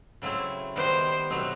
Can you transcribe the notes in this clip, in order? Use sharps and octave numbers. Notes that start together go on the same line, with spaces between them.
C#3 F#3 A3 C4 E4
D#3 G3 B3 C5
B2 F#3 A3 C4 D#4